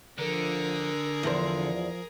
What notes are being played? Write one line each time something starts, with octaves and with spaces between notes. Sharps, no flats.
D3 F3 G#4 A#4
E2 F3 D4 C5